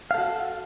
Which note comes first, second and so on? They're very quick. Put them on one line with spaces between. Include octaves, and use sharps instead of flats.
F5 A4 F#4